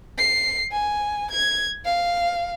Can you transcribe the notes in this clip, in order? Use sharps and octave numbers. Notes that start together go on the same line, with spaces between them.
C7
G#5
G#6
F5